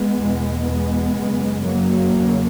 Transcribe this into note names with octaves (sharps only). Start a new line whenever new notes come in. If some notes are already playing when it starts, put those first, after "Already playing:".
Already playing: G#3 B3
E2 B2
G#3 B3
F#2 C#3
F#3 A#3
E2 C#3